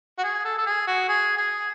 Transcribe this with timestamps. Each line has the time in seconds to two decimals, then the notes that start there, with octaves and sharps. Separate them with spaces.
0.19 F#4
0.23 G#4
0.45 A4
0.58 A4
0.66 G#4
0.87 F#4
1.08 G#4
1.37 G#4